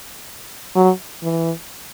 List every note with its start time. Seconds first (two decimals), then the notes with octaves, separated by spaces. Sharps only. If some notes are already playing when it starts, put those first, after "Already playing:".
0.76 F#3
1.23 E3